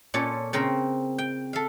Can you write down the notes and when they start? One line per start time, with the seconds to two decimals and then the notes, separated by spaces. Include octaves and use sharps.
0.14 A#2 C#4 F4 A4
0.53 C#3 C4 A#4 C5 A#5
1.18 G5
1.53 A4 E5 F5